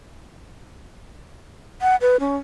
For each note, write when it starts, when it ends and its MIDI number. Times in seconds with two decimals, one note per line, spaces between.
1.81 1.96 78
2.01 2.17 71
2.20 2.36 61